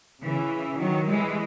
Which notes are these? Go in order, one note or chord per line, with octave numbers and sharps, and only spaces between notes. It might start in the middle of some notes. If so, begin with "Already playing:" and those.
C#3 E3
D#3 F#3
E3 G#3